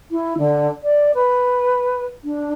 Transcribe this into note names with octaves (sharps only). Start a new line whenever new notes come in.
E4
D3
D5
B4
D4